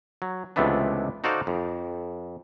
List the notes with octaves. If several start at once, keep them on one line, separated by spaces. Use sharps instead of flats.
F#3
C#2 C3 E3 A3 B3 D4
D#4 F#4 A4 C5 D5 F5
F2